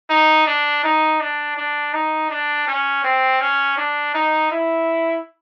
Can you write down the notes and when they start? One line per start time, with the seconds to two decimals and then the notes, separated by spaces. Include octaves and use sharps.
0.10 D#4
0.47 D4
0.84 D#4
1.20 D4
1.57 D4
1.93 D#4
2.30 D4
2.67 C#4
3.04 C4
3.40 C#4
3.78 D4
4.14 D#4
4.51 E4